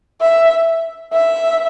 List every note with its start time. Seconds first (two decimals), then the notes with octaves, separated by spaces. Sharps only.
0.21 E5
1.13 E5